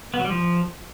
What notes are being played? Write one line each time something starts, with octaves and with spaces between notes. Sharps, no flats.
B3
F#3
G3
F3